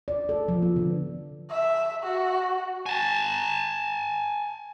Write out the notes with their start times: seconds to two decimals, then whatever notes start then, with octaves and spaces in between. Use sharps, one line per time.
0.08 D5
0.29 A4
0.48 F3
0.62 B3
0.76 D3
1.50 E5
2.03 F#4
2.86 G#5 A5